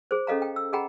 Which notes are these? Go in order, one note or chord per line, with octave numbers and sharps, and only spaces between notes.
G#4 C5
C#4 A4 D#5 F5 A#5
G5
E6
G#4 D#5 F#5 G5 A#5 B5